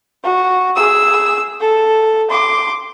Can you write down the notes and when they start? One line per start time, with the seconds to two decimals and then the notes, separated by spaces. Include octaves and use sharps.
0.24 F#4
0.76 G#4 E6
1.60 A4
2.31 C6 D6